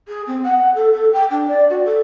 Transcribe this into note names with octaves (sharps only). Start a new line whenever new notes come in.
G#4
C4
F#5
A4
A4
G5
D4
D5
F#4
A4